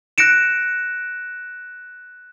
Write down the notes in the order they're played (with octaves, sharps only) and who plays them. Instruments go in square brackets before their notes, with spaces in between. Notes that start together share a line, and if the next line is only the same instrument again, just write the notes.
[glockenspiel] F#6 A#6 C#7 D7 E7